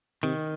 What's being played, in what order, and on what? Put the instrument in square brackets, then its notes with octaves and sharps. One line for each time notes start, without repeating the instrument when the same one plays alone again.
[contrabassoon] C3 [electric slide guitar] D#3